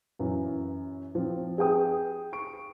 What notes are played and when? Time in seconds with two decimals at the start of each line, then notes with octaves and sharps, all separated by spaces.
0.19 F#2 E3
1.15 F3 C4
1.58 G#4 B4 G5 D#6
2.33 C#6 D7